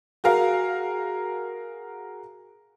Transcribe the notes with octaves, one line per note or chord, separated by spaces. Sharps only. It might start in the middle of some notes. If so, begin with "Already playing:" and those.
F#4 G#4 A#4 F5